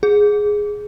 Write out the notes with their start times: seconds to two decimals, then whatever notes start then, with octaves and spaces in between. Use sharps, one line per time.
0.03 G#4